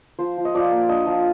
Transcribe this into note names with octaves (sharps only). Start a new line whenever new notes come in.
F3 C5
F3
D#5
F3 D5
A#3
D4 D#5
F3